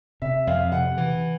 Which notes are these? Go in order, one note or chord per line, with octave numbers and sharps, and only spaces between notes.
C3 E5
F2 F5
C3 F#5
E3